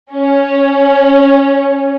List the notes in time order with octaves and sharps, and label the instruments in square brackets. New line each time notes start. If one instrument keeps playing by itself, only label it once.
[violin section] C#4